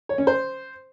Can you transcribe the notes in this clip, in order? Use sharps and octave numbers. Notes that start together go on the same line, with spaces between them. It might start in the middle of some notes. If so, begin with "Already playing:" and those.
C#5
C#4
C5